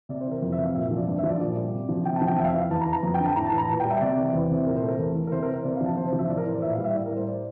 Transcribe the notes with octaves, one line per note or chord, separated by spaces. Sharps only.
C3 D5
C5
E3
A#4
F2 C5
E5
C3
F5
A#2 E5
E5
F3
D5
G2
E5
F3
D5
A#2 D5
G3
C3
F3
C3 G5
A5
F3
G5
F2 E5
F5
E5
E3
F5
E2 A5
A#5
E3
A#5
F2
G5
D3
A5
A2 A#5
A5
E3
A#5
A#2 A5
G3 G5
E5
C3 D5
E3
E2 C5
C3
A#2 A#4
C5
A3
A#4
E2
E3
A#4
C3 C5
A#4
E3
C5
C3 D5
F5
F3
A5
C3 C5
C5
F3
E5
A2 D5
A#4
E3 C5
D5
A#2 E5
F5
G3
E5
A2 D5
A#4
G3
C5
D5